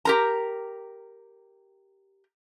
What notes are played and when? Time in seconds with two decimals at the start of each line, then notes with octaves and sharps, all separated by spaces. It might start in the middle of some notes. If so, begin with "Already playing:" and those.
0.05 G4 A#4 A#5